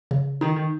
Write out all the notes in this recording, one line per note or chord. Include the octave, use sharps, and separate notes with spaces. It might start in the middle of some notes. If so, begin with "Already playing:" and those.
C#3
D#3 D#4
D#3